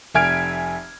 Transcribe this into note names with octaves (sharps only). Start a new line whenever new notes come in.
F1 E5 G#5 F6 G#6 D7